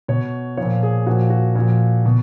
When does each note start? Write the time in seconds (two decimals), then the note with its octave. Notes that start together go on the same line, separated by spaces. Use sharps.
0.08 B2 C#5
0.57 F3 C#5
0.62 A#2
0.83 G#4
1.06 A#2 F3 F#4
1.30 F#4
1.55 A#2 F3
2.05 B2